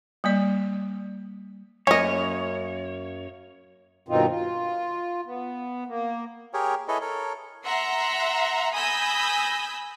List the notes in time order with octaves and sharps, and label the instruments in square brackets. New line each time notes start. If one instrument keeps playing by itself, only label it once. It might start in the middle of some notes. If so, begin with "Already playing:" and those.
[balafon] G3 A#3 D5
[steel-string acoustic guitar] F#2 A#3 [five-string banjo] C#4 D#5 [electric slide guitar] C#5
[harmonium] G2 B2 D#3 C4 D#4 F4
F4
B3
A#3
[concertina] G4 G#4 A#4 C#5
E4 G#4 A4 B4 C#5 D#5
A4 A#4 C#5
[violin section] E5 F#5 A#5 C6
G#5 B5 D#6 E6 G6 A#6